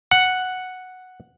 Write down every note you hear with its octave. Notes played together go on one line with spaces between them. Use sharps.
F#5